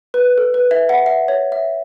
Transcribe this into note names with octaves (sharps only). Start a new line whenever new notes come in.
B4
A4
B4
E5
F#5
E5
C#5
E5